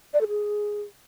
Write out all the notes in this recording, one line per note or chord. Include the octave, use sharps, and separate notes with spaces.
D5
A4
G#4